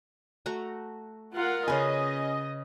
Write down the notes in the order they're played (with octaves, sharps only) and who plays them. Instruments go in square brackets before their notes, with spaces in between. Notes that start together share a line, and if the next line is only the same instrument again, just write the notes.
[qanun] A3 F#4 A#5
[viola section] F4 A#4 F#5
[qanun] C#3 B4 [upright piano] C#4 G#5 [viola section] D#5